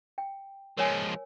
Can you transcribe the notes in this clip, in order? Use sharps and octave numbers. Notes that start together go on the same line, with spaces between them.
G5
F3 G#3 A#4 C#5 G#5